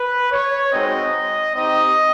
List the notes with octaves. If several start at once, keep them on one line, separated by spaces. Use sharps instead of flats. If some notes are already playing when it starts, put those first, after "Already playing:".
Already playing: B4
C#5
G#3 C4 D#4 F#4 D#5
C4 D#4 G4 D#5